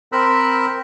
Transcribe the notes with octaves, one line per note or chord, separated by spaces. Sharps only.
C4 A#4 C5 B5 E6 F#6